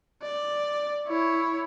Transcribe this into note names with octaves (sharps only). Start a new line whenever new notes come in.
D5
E4 C#5